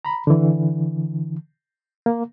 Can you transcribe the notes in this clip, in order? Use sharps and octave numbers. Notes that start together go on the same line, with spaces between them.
A#5 B5
D3 E3
A#3